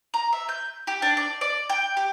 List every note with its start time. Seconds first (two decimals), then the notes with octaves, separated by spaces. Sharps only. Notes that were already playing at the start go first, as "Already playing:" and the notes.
0.14 A#5
0.33 E5
0.49 G6
0.87 G4
1.02 D4
1.17 D5
1.41 D5
1.69 G5
1.97 G4